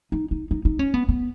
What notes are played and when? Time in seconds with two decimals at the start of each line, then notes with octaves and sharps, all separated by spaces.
0.12 D#4
0.31 D#4
0.51 D#4
0.65 D#4
0.79 C#4
0.94 B3
1.09 B3